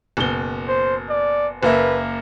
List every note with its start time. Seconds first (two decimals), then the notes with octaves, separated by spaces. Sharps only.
0.17 F#1 B2 G7
0.68 C5
1.10 D5
1.63 F#1 A#3 B4 E5